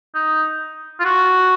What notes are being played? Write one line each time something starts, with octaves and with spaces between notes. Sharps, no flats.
D#4
F4
F#4